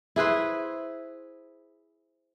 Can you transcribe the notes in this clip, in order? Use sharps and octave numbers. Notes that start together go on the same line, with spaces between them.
E4 G#4 B4 C5